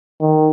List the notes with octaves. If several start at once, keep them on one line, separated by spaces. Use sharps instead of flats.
D#3